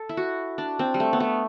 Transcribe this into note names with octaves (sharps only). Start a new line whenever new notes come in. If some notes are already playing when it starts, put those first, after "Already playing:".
Already playing: A4
E4
F#4
D4
C4
G3
A3
B3
A3